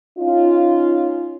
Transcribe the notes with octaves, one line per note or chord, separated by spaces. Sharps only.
C#4 D#4 F4